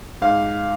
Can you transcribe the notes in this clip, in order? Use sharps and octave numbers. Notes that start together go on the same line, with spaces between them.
G#2 F5